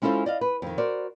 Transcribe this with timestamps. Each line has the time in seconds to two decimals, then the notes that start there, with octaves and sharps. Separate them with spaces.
0.02 G#3 C#4 E4 F4 A4 C5
0.26 D5 D#5 F5
0.41 B4
0.62 F2 D#3
0.78 F#4 A#4 C5 D5